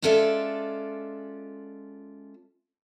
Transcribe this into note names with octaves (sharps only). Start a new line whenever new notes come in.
G#3 C#4 F4 A4 D5 E5